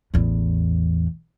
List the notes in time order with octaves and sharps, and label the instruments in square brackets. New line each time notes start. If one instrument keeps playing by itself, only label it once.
[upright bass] A1 E2